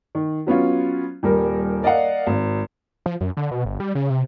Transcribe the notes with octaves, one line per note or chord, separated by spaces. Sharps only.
D#3
F#3 B3 C#4 F4
D#1 G3 A#4
A#4 D5 D#5 F5 F#5
G#1
F3
F#2
D3
B2
G1
G3
C#3
C3